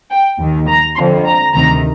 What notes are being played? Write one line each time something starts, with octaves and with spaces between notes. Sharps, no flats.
G5
D#2 D#3
A#5
F2 D3 F3 C6
A#5
D2 C3 D#3 A#5